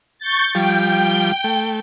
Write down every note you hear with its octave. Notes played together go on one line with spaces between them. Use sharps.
C#6 G6 A6
F3 G3 G5 G6
A3